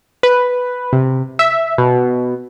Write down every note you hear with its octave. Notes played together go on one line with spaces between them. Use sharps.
B4
C3
E5
B2